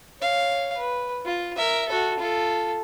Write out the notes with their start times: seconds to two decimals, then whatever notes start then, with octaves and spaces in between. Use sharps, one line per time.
0.20 C#5 F5
0.77 B4
1.25 F4
1.57 A#4 E5
1.88 F#4 A4
2.19 F4 A4